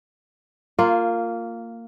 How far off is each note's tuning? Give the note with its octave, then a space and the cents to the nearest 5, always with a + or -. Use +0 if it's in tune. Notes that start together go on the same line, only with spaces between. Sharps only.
A#3 -20 F4 +0